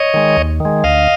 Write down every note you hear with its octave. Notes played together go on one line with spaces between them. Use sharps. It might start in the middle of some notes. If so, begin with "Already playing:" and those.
Already playing: C#5 D#5
D#3 G#3
D#2
D#3 G#3
D2 D#5 F5